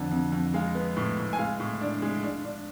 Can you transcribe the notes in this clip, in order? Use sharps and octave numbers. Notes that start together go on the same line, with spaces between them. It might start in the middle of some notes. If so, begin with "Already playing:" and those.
Already playing: F2 D3 A5
F2
F2
G#3 F5
B3
A2
A2
G#5
G#3 F5
A2
D4
G#3
D4
D4